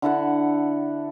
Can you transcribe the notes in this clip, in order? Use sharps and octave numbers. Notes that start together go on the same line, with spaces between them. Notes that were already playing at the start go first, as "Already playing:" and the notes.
D3 E4 A4 F#5